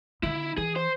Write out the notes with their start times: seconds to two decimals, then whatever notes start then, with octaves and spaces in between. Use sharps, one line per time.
0.23 D3 B3 E4
0.58 E3 G#4
0.76 C5